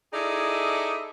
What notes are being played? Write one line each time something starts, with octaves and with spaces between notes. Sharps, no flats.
D#4 E4 G#4 A4 D5 D#5